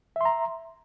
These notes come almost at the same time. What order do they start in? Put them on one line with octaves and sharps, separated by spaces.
E5 C6 A#5